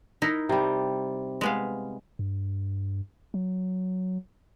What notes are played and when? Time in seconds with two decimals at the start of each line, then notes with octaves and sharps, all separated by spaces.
0.22 D#4 E4 A#4
0.49 C3 G3
1.41 G#3 B3 F5
2.19 G2
3.34 F#3